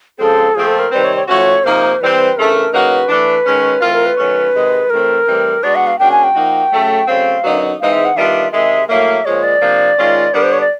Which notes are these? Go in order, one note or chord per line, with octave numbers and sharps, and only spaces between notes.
C#3 F3 G#3 C4 A4
A#2 F3 A3 C4 G#4
A4
A#4
C3 D#3 G3 C4 B4
C#5
C#5
F3 A3 C#4 F#4 C#5
C3 F3 A#3 D#4 C5
E3 G3 C4 B4
C#3 E3 A3 D4 A#4
C#3 F#3 A#3 D#4 F#4 B4
E3 A3 D4
D#3 G#3 C#4
E3 A3 C4 F4 A#4
A#4
B4
D#3 F#3 A3 C#4
C3 D#3 G#3
A2 E3 A3 C4 A#4
A2 E3 G3 C4
B2 G#3 B3 D4 F#4 D5
F#5
F5
C#3 F#3 A#3 D4 F#4 G5
G#5
G5
F3 A#3 D#4 F#4
C#3 F#3 A3
C#3 F#3 A3 C4 F5
F#2 D3 F#3 B3 D#4
G#2 E3 G#3 C4 D#4 F5
E5
F#5
D#3 G3 B3 D4 F4 E5
C3 D#3 G#3 E5
A2 F#3 A#3 E5
A#2 F3 G#3 C#5
D5
C3 F3 A#3 D4
D#3 G#3 C#4 F4
D3 G3 B3 D4 A#4
C5
C#5
D5